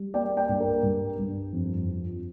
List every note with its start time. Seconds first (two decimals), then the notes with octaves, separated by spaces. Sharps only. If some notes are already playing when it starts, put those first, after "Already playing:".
Already playing: G3
0.14 A#3 D5 G5
0.37 D5 G5
0.49 G2
0.60 A#4
0.83 G2
1.18 G2
1.53 F2
1.88 F3